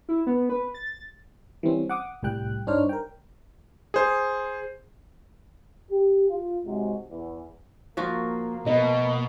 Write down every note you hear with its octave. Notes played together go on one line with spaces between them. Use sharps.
E4
B3
B4
A6
E3 G3 C4 C#4
F#5 D6 D#6
C2 A2 G3 G5 F#6
G2 D4 D#4 C5 C#5 F6
A#4 G5
G#4 C5
G4
F4
G#2 C3 F#3 G#3
E2
F3 A#3 F4 F#4
B2 D#5